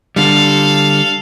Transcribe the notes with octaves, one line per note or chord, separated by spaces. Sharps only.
D3 G3 A4 F5